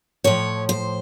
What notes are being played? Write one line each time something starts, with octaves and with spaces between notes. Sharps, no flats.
A2 F3 C#5
C5